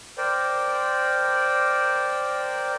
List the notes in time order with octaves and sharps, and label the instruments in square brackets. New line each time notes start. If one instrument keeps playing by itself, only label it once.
[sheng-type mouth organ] A#4 C5 D5 G5